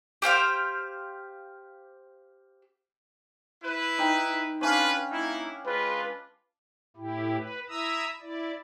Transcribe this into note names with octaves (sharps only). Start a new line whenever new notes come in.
G4 C5 F5 G5
E4 B4
D#4 G5
C#4 D4 F4 B4 F5
A#3 D#4 E4
G#3 F4 B4
A2 E4 G4
B4
E4 E5 A#5 D#6 E6
E4 D5